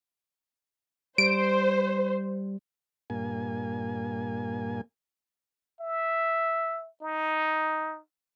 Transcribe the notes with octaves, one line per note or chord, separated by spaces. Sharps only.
G3 C5 D7
G2 A#2 A#3 G#5
E5
D#4